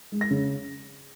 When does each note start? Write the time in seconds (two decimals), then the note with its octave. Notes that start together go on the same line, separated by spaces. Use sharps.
0.12 G#3
0.21 A#6
0.30 C#3